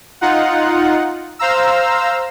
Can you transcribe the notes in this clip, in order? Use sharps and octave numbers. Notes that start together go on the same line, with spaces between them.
D#4 F4 F#5
C5 F5 A#5 E6